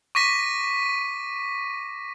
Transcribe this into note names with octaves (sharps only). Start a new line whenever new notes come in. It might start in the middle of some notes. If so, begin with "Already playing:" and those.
C#6 D6 A#6 B6 D#7